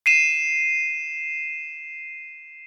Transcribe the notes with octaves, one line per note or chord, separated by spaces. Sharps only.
C7 D#7 E7